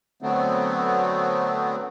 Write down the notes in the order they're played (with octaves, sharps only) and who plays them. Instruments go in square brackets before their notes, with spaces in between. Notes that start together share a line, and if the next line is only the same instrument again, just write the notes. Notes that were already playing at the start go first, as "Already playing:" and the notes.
[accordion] D3 F#3 A3 B3 C4